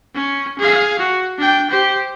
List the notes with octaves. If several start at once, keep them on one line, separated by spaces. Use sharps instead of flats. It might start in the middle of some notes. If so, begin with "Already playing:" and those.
C#4
G#4 F5
F#4
D4 G5
G4 C5